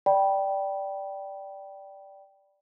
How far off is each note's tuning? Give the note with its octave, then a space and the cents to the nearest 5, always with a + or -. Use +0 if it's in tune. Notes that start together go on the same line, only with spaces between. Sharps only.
D5 +0 G5 -10 B5 -20